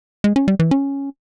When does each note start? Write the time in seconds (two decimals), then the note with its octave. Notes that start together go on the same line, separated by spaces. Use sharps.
0.24 G#3
0.36 C#4
0.48 G3
0.59 E3
0.71 C#4